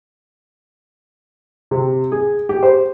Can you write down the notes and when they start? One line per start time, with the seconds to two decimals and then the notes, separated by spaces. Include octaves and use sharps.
1.71 C3
2.12 G#4
2.49 G4
2.63 C5